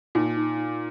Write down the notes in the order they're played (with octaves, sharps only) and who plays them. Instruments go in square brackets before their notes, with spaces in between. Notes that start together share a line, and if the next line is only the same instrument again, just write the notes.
[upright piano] A#2 [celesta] D#4
[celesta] D#4
D#4